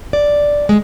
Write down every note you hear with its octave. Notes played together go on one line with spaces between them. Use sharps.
D5
G#3